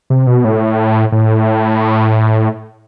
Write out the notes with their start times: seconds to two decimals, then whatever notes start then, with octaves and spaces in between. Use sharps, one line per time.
0.10 C3
0.27 B2
0.45 A2
1.12 A2